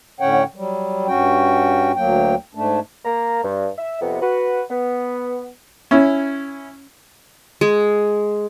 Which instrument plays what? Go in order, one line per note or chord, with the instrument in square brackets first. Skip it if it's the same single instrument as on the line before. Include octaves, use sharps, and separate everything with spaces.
[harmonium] A2 D3 C#4 C#5 F#5 G5
F#3 G3
G2 C#4 F#4 G5
D2 F#3 A#3 G5
G#2 A3 D4
[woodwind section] A#3 A#5
G2
E5
F2 C3 B3
F#4 B4
B3
[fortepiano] C#4 E4
[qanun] G#3